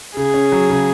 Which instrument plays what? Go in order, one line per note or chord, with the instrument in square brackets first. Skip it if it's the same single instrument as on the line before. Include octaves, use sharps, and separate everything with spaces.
[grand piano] C#3 [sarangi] G#4
[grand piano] C#4
F#3
C#3